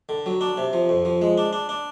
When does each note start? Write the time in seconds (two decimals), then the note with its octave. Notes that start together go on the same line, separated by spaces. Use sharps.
0.09 D3
0.26 F#3
0.41 D4
0.57 C3
0.73 F3
0.89 F2
1.05 F3
1.22 G#3
1.38 D4
1.53 D4
1.69 D4